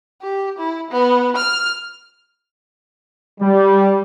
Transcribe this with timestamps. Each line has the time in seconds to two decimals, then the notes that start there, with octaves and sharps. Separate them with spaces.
0.22 G4
0.58 E4
0.91 B3
1.36 F6
3.41 G3